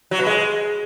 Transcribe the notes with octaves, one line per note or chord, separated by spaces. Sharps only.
F#3
B2
G#3